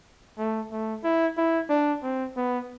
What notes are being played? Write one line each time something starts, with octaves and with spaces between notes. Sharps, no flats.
A3
A3
E4
E4
D4
C4
B3